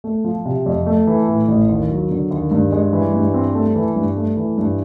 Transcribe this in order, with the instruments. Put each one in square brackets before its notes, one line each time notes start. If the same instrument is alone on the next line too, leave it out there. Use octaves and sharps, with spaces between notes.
[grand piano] A3
F3
C3
F2
A3
E3
A2
A1
D#2
F#3
D3
D#2
G2
G#3
E3
G2
C4
A3
E3
G2
A3
E3
G2